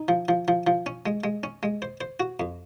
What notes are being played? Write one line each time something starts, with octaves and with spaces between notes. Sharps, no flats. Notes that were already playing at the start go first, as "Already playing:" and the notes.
Already playing: D#4
F3
F3
F3
F3
C#4
G#3
G#3
C#4
G#3
C5
C5
F#4
F2